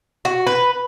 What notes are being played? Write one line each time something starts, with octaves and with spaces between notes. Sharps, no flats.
F#4
B4